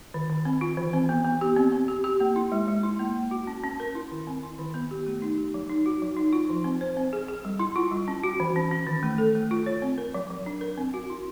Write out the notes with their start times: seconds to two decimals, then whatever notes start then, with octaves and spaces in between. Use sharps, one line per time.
0.14 D#3
0.30 D#3
0.45 C4
0.61 F4
0.77 E3
0.93 C4
1.09 B3
1.25 B3
1.41 G4
1.56 C4
1.72 C4
1.88 G4
2.04 G4
2.20 A#3
2.36 E4
2.52 G#3
2.68 G#3
2.83 E4
2.99 A#3
3.16 A#3
3.31 F#4
3.47 C#4
3.64 C#4
3.80 A#4
3.95 E4
4.11 D#3
4.27 C4
4.43 E4
4.59 D#3
4.74 B3
4.91 G4
5.07 A3
5.22 D#4
5.38 G4
5.54 F#3
5.70 D#4
5.86 F#4
6.02 F#3
6.17 D#4
6.33 F4
6.49 F3
6.64 C4
6.81 C5
6.97 C4
7.13 G#4
7.28 G#4
7.45 G3
7.59 E4
7.76 F4
7.91 G3
8.08 C#4
8.23 F#4
8.40 E3
8.56 C#4
8.71 C#4
8.87 D#3
9.03 A3
9.18 A4
9.35 A3
9.51 F4
9.66 C#5
9.82 C4
9.98 A#4
10.14 F#3
10.30 F#3
10.46 D4
10.61 A#4
10.78 C4
10.94 F#4
11.10 E4